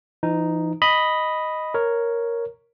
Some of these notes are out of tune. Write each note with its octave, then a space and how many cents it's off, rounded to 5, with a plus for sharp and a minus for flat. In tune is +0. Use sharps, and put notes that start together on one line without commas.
E3 +45 D#4 +0
D#5 +0 B5 +0
A#4 +0 C#5 +0